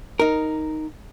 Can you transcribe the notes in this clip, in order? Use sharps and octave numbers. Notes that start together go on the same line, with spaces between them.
D#4 A#4